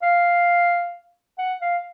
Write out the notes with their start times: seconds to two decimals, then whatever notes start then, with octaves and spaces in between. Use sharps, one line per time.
0.02 F5
1.38 F#5
1.61 F5